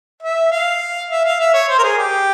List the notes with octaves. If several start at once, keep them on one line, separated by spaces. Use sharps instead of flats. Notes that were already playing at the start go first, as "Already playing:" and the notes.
E5
F5
E5
F5
E5
C#5
C5
A#4
G#4
G4